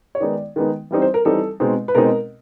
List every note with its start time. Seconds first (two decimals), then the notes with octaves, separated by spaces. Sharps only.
0.15 C#5
0.20 D#3 G#3 B3 D#4 D5
0.56 D#3 G#3 B3 D#4
0.91 E3 G3 C4 D#4
1.02 C5
1.14 A#4
1.25 E3 G3 C4 D#4 A4
1.60 B2 G#3 C4 D#4
1.88 B4
1.95 B2 G#3 C4 D#4 A#4